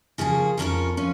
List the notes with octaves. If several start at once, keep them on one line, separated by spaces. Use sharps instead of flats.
C#3 F3 A#3 C#4 G#4
F2 F3 C#4 A#4 C#5
F3 C#4